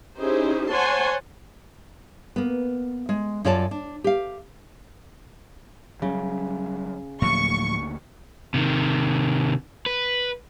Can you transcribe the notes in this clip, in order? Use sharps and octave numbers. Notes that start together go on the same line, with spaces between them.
C#4 D#4 E4 G4 G#4 C5
C5 C#5 F#5 G#5 A5 C6
A#3 B3
G#3
F#2 F4 C#5 D5 A5
D4
G4 F5
C#3 F#3 G3 C#4
D2 A2 F3 F#3 A#3 C#6
C3 D#3
B4